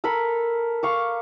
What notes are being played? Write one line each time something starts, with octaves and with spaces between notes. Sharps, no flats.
A4 A#4 B5
F5 C#6 D6